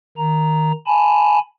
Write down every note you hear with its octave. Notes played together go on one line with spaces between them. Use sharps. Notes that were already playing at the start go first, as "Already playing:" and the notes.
D#3 A#5
G#5 A5 B5